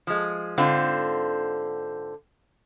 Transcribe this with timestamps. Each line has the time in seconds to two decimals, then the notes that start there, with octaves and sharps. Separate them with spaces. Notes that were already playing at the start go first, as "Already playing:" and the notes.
0.07 F3 G#3
0.58 G#2 D3 C4 F4